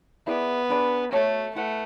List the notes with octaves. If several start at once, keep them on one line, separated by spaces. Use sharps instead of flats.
B3 E4 G#4 D5
D4 G#4 B4 D5
A3 F#4 A4 C#5
A3 E4 B4 F#5